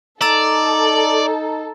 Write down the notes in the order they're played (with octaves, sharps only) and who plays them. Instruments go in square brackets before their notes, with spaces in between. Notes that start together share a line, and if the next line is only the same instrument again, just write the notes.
[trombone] D#4 [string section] A4 [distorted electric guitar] D5 [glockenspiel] A#5 E6 A6